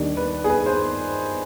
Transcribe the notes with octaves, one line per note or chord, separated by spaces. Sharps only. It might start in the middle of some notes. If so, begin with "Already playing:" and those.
Already playing: D#2 D#3 G3 D4 D5
B4
G#4
B4
C5